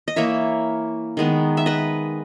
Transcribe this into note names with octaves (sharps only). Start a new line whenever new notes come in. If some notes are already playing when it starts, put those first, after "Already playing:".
D#5
E3 A#3 C#5 E5
D#3 G#3 B3
E5
B4 D#5